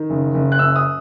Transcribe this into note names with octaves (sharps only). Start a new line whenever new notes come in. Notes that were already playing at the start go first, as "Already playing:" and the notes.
Already playing: D#3
F#1
F#1
F#6
F#2 E6
D#6